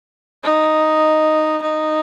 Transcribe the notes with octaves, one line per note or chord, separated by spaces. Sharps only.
D#4
D#4